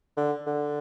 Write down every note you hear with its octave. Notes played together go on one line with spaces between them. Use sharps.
D3
D3